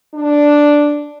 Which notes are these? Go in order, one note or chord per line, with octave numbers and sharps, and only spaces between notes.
D4